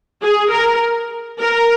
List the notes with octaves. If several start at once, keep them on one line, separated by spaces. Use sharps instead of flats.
G#4
A#4
A#4